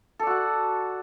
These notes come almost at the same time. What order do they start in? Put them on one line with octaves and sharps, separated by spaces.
A4 D5 F#4 F#5